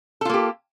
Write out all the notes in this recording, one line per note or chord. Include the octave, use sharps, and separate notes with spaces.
A#3 F4 G4 A4